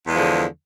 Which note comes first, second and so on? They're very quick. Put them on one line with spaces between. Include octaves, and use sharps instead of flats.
E2 G#3 F3 D3